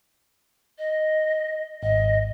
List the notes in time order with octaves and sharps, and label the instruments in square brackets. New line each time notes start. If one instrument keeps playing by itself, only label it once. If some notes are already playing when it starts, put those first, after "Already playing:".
[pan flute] D#5
[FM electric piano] G#1 [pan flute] D#5